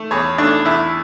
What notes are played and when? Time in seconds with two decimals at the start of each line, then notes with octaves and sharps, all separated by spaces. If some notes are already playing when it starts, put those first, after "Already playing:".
Already playing: A3
0.11 E2 C#5
0.38 A3 D4
0.65 E2 E4